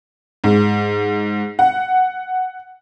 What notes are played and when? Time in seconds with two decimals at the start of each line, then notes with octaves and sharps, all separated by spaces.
0.44 G#2
1.59 F#5